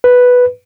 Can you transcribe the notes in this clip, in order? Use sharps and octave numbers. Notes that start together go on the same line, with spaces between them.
B4